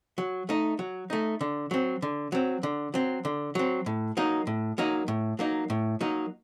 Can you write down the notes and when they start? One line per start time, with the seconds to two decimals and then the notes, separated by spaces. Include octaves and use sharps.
0.18 F#3
0.49 A3 D#4
0.79 F#3
1.10 A3 D#4
1.41 D3
1.71 F#3 C4
2.02 D3
2.32 F#3 C4
2.63 D3
2.94 F#3 C4
3.25 D3
3.55 F#3 C4
3.86 A2
4.17 F#3 A#3 D#4
4.47 A2
4.78 F#3 A#3 D#4
5.08 A2
5.39 F#3 A#3 D#4
5.70 A2
6.01 F#3 A#3 D#4